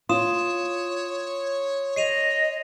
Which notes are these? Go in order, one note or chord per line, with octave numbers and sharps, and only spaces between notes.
F4 C#5 C6 D#6 E7
D#5 C7 D#7 F7